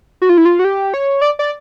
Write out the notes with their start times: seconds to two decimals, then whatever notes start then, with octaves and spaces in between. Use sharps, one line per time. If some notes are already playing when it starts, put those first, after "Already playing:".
0.22 F#4
0.29 F4
0.38 E4
0.45 F4
0.59 F#4
0.65 G4
0.94 C#5
1.22 D5
1.39 D5